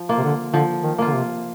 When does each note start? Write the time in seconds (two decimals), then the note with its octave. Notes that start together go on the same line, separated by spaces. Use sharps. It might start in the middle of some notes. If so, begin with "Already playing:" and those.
Already playing: F3
0.09 A#3 F4
0.18 C3
0.24 D3
0.53 D3 F3
0.83 D#3
0.98 A#3 F4
1.08 D3
1.14 C3